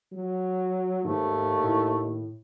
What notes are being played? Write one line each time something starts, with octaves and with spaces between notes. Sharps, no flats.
F#3
D#2 G#2 A3
A2